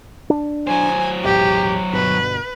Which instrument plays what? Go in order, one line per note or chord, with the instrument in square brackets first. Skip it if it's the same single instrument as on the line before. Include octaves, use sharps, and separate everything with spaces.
[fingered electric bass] D4
[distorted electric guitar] F#3 C5 [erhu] G#5
[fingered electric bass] E1 A1 [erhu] G4
[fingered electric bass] G1 B2 [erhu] B4